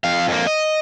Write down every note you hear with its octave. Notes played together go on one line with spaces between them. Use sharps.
F2 F5
F2 A#3
D#5